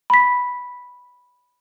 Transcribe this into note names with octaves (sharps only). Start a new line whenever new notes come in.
B5 B6